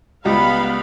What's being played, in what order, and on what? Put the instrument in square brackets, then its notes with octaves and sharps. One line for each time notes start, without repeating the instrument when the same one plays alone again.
[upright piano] C#2 G3 [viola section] B3 F5 B5